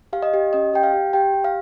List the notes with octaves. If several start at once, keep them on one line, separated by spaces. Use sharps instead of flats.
G4 F5
D#5
G4
C#4 D#5
G4 G5
F5
G4
G4 G5
G4
F5